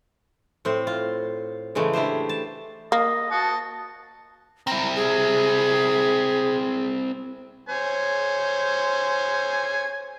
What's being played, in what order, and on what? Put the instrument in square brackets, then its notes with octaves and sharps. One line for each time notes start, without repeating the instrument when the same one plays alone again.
[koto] A2 C4 C5
F4
C#3 E3 G#3 A3
D4 E4 G4 C5
A5
[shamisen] A#3 [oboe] D#5
[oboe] F#4 [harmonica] A5 D#6
[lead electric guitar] C4 E4 [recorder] A#5
[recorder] G#4
[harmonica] C5 C#5 G#5